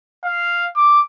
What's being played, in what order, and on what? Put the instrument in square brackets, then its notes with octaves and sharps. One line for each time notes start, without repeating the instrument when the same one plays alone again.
[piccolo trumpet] F5
D6